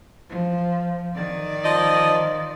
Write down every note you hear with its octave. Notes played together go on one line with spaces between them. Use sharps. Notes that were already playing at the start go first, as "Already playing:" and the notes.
F3
D#3 D5
F3 D#5